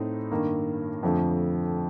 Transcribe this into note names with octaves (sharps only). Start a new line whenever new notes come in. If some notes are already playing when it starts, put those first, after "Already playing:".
Already playing: A2 A3 C4 D#4
G2 D#3 A#3
F2 D3 F3 A3